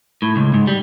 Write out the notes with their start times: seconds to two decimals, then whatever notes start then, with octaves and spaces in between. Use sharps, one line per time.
0.22 A2
0.36 C#2
0.54 G#2
0.67 G3